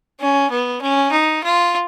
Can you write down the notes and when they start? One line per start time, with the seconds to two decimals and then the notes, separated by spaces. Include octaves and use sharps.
0.20 C#4
0.50 B3
0.81 C#4
1.11 D#4
1.43 F4